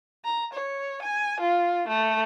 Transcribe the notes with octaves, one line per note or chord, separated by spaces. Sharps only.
A#5
C#5
G#5
F4
A3